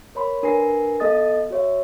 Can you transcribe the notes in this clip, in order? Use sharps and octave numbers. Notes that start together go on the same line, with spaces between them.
A#4 C#5 B5 C6
D4 A#4 B4 G#5 A#6 C7
B3 A4 D#5 D#6 A6
F#4 C#5 E5